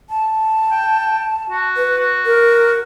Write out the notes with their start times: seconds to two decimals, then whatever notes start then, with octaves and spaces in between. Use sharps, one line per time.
0.09 A5
0.71 G5
1.50 F#4
1.76 B4
1.98 F#4
2.25 A#4